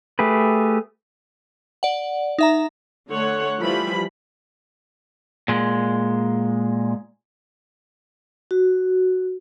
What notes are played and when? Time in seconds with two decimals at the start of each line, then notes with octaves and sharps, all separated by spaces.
0.19 A3 G4 G#4 B4
1.83 D5 F#5
2.38 D#4 E5 A#5
3.09 D3 A3 C#5 F#5
3.59 E3 F3 G3 B5
5.48 A#2 G#3
8.51 F#4